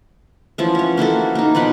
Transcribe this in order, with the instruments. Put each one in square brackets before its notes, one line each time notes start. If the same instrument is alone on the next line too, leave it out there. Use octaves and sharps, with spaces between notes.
[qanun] E3 F3 C#4 F#5
C#4 C#5
A#3 E4 F#4 A4
A#3 D#4
B2 F3 B4 F#5